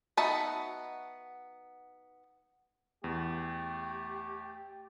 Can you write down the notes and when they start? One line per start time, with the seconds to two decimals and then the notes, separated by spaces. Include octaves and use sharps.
0.17 B3 D#4 F#4 E5 A5
3.04 E2 A3 G4